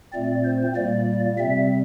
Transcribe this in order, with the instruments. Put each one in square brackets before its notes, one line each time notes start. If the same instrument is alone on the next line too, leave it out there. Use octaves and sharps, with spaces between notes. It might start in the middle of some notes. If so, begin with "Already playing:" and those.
[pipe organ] A#2 A3 C4 D5
C5
A#2 G3 A#3 D5
C3 G3 C4 E5